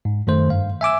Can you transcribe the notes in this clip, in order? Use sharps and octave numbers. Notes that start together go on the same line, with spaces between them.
G#2
F#2 D#3 A3 C5
G2 F5
E5 G#5 D6 E6